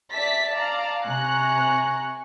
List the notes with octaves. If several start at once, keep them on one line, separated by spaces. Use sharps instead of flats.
D5 E5 A5 B6
D5 F5 A5 A#5
C3 G#5 A#5 C#6 F#6